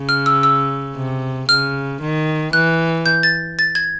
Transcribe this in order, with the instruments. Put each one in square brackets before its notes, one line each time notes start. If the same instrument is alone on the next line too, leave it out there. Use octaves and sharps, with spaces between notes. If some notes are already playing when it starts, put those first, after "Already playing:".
Already playing: [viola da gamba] C#3
[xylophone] F6
E6
E6
[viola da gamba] C3
[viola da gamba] C#3 [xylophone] F6
[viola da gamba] D#3
[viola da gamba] E3 [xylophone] F#6
[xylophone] G6
A6
A6
G#6